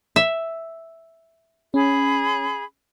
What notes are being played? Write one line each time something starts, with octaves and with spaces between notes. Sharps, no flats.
E5
C#4 G#4 B5